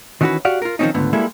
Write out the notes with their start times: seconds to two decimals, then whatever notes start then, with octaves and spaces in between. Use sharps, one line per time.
0.21 D#3 E3 C#4 F4 F#4 B4
0.45 F#4 G4 D5 F5 F#5
0.62 F4 A#4
0.79 D#3 F3 A#3 C4 C#4 D#4
0.94 C#2 G#2 D3 A3 B3
1.13 G3 G#3 A#3 E4 A4